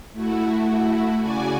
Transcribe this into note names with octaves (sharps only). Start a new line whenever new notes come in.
A3 E4 F#4
C#3 F#4 D5 G#5